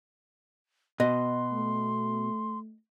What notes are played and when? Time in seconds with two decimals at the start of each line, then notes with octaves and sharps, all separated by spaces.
1.00 B2 D#5 C6
1.52 A3